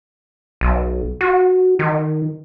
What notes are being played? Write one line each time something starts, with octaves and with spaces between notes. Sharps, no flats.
B1
F#4
D#3